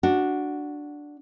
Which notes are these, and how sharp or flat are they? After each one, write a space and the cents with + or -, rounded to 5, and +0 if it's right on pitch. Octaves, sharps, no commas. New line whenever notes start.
D4 +0 F#4 +0